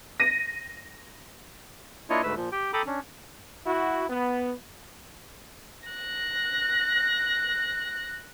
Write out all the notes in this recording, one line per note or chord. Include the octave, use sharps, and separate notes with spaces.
A#6 D#7
A#3 D4 E4 F4 C#5 D#5
D2 G#2 A3 B4 E6
A#2 F3
G4 G5
A4 G5 A#5 B5 D6 D#6
C#4 D4
E4 F#4
B3
F#6 A#6